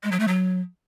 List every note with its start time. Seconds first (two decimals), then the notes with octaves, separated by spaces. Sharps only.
0.04 G#3
0.12 F#3
0.20 A3
0.28 F#3